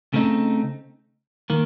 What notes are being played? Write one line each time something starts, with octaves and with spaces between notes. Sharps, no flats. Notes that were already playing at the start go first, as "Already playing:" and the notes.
C#3 A3 C4 D#4
D#3 A#3